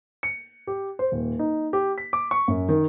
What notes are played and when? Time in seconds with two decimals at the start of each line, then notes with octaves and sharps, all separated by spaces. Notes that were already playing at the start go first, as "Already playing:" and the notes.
0.23 C#7
0.67 G4
0.99 C5
1.12 D#1
1.39 D#4
1.73 G4
1.98 B6
2.13 D6
2.31 C#6
2.48 F#2
2.69 D#3